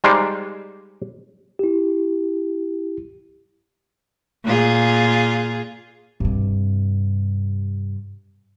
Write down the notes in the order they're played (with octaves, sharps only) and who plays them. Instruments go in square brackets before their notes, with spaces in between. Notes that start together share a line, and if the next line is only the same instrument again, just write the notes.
[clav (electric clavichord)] G3 G#3 D#4 C5 D5 F5
[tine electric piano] E4 G4
[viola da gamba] A#2 F4 G#4
[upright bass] G2 C3